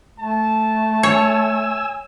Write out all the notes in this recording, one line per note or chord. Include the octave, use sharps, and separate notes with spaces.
A3 A5
C#5 G#5 E6